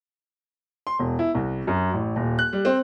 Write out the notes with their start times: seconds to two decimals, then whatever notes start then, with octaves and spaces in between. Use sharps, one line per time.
0.87 C6
0.99 E1
1.19 E4
1.35 C2
1.67 F#2
1.93 A1
2.16 D#1
2.39 F#6
2.53 G3
2.65 C4